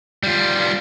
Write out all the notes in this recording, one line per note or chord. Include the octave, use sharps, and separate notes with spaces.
G3 F4